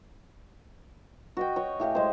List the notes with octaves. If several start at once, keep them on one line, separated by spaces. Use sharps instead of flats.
F#4 D#5 G5
F#4 C#5
A2 G4 F5 G#5
G#3 C5